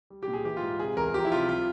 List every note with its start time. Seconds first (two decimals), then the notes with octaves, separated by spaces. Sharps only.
0.10 G3
0.23 G4
0.28 A#2
0.33 G#4
0.45 E3 G4
0.57 F4
0.62 G#2
0.79 C3 G#4
0.97 E2 A#4
1.14 F3 G4
1.25 E4
1.32 C3 F4
1.49 G3 F4